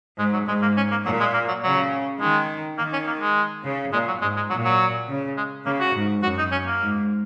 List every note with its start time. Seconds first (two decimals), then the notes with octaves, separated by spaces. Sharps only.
0.18 G#2 G#3
0.33 F#3
0.47 G#2 G#3
0.62 A#3
0.77 C#4
0.91 A#3
1.05 A#2 F#3
1.20 G#3
1.34 A#3
1.48 F#3
1.63 C#3 F#3
2.20 D#3 G#3
2.78 D#3 A#3
2.93 C#4
3.07 A#3
3.21 G#3
3.65 C#3
3.93 A#2 G#3
4.08 F#3
4.22 G#2 G#3
4.36 G#3
4.50 A#2 F#3
4.64 F#3
5.08 C#3
5.37 G#3
5.66 C#3 A#3
5.80 F#4
5.94 G#2
6.23 F#2 F#4
6.38 D#4
6.52 C#4
6.66 A#3
6.81 G#2